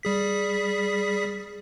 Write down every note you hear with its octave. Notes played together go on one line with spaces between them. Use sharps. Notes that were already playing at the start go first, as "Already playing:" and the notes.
G3 G#4 B6